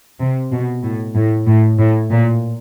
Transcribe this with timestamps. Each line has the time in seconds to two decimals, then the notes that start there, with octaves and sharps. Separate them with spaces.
0.20 C3
0.52 B2
0.83 A2
1.15 A2
1.46 A2
1.78 A2
2.11 A#2